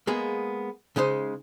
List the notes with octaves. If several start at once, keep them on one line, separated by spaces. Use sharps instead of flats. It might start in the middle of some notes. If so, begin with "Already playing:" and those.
G#3 A#3 B3 G#4
C#3 G#3 D#4 C5